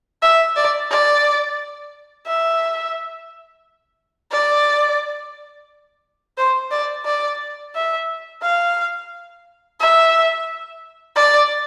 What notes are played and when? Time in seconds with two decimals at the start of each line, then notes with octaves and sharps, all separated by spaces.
0.22 E5
0.56 D5
0.91 D5
2.27 E5
4.32 D5
6.38 C5
6.71 D5
7.06 D5
7.75 E5
8.42 F5
9.80 E5
11.16 D5